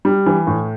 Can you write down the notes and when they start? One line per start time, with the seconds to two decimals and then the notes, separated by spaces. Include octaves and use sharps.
0.05 G3
0.26 E3
0.47 A2